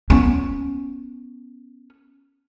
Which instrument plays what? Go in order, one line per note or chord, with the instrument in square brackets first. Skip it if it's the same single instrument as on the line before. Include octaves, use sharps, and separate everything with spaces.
[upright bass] B3 C#4